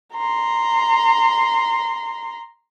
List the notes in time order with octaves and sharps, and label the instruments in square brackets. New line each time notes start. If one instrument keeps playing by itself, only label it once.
[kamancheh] A#5 C6